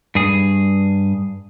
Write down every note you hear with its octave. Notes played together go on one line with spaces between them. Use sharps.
G2 G#4